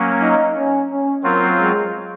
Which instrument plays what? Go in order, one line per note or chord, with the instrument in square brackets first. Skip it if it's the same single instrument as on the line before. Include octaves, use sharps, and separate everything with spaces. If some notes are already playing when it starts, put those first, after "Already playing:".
Already playing: [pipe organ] F#3 A#3 C#4
[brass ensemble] D#4
C#4
C#4
[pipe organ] F#3 C4 F4 [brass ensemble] A#3
[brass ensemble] G#3